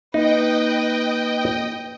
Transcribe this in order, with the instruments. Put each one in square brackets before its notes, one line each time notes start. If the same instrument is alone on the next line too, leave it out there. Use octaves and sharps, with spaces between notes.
[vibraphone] A#3 [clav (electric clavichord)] D#4 [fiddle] B4 [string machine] D#5 G5